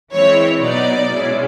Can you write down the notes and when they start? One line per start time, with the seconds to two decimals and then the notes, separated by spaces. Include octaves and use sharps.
0.13 E3 G#3 C4 E4 C#5
0.61 B2 F#3 B3 D#4 D5
1.11 B2 G#3 C#4 E4